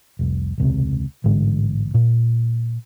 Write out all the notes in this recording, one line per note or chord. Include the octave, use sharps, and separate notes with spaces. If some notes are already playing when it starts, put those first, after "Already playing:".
F1 C2
E1 C#2 C3
A1 G#2 D3 G#3
A#2